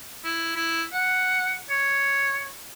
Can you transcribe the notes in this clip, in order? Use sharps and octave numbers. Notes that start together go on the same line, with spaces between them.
E4
E4
F#5
C#5